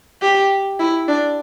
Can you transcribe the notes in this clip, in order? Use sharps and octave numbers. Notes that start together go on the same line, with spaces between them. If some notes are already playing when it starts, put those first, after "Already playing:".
G4
E4
D4